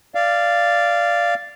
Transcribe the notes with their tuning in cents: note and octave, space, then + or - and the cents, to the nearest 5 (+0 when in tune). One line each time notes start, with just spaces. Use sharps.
D5 +0 F5 -15